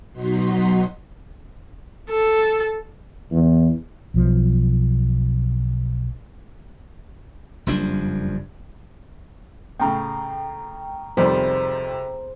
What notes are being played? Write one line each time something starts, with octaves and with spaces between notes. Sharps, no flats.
B2 F#3 D#4 F#4 C6 B6
A4
E2
B1 F3
F#1 F2 G3 D4
A2 C#3 G5 A#5
F2 C3 D#3 G3 G#4 C5